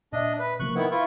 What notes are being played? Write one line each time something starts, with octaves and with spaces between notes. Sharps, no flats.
A#2 D4 D#5 E5
B4
C3 F3 A#3 C#6 F#6
D#3 B3 E4 B4
E4 F4 B4 C#6